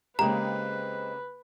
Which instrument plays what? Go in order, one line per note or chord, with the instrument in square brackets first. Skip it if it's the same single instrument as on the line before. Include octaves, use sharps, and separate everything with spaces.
[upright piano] C#3 A#3 G4 [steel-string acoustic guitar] G#3 C4 [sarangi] B4 [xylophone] A#5